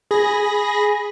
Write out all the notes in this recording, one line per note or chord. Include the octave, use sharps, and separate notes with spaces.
G#4 B5 A#6